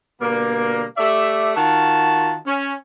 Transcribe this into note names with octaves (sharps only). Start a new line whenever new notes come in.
B2 D3 G3 A#3
A3 G4 D5 E5
D#3 F4 F#4 A5
C#4